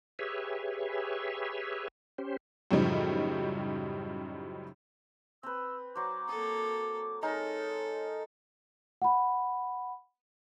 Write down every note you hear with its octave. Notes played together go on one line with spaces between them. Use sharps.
G4 G#4 B4 C#5 E5
C#4 G4 C5
F#2 A2 C#3 F3 G3 D#4
C4 B4 E6
F#3 C5 D6
A#3 A4 D#6
G#3 D#4 A4 A#4 C#5
F#5 B5